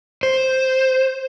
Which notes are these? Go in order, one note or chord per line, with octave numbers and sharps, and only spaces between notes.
C5